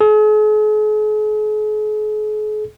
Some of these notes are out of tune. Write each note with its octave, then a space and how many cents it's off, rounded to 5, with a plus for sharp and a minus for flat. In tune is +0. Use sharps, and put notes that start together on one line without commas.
G#4 +45